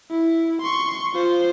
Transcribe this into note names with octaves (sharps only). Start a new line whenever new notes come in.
E4
C6 C#6
F4 C5